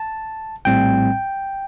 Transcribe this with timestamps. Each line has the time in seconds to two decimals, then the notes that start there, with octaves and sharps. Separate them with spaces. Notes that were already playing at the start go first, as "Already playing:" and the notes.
Already playing: A5
0.65 A#1 A2 G3 C4 G5